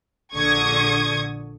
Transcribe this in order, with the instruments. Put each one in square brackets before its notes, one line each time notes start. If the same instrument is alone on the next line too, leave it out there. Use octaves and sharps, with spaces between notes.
[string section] A#1 D3 C#6 D#6 G#6